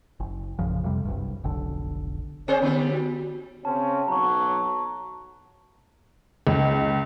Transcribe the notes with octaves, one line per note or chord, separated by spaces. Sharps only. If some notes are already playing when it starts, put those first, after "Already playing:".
F#1
A#1 F#2 C#3 F3
F2 C3 G3
F#1 C2 G2
F1 B1 D3
C4 G#4 C5 D5
D3 G3 B3
F#4
C#3 C4 C#4 A5
B1 F#3 A#5 C#6
C#2